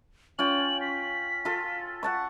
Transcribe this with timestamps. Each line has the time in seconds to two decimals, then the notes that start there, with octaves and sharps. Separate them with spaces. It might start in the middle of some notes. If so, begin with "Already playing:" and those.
0.39 C#4 F4 G5 F#7
0.81 B6
1.45 F4 A4
2.03 F#5 A5 C#6